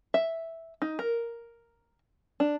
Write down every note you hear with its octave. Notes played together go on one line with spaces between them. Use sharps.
E5
D#4
A#4
D4